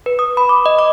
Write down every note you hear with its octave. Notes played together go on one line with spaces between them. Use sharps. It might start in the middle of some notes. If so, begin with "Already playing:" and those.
B4
D#6
B5
D6
D#5
D6